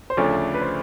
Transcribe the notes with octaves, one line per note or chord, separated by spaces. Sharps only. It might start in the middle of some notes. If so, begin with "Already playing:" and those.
C5
D2 C#3 F3 A3 D4 C#5
B4
C5